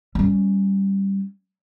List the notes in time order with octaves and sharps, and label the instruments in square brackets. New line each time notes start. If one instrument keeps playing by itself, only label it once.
[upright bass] G3 C#4